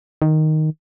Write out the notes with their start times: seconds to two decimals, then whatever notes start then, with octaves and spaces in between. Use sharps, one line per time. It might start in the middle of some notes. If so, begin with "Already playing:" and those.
0.22 D#3